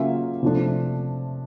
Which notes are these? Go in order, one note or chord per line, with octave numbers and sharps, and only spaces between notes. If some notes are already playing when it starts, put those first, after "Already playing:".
Already playing: C#3 F#3 A#3 C#4 F4 E5
C3 F3 A3 D4